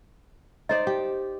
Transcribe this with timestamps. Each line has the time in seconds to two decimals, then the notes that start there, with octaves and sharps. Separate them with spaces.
0.69 D#4 C5 D5 D#5
0.87 G4